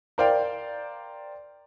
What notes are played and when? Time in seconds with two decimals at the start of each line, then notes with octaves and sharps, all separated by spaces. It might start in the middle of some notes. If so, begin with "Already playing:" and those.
0.18 A#4 C5 D5 F5 G5